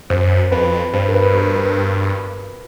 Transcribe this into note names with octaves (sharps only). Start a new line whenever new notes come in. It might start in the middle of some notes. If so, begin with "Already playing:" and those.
F#2 C5
F2 B4
G2 C5
A#4
B4
A#4
B4